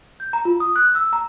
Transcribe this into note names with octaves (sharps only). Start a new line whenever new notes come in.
G6
A#5
F4
D#6
F#6
E6
A#5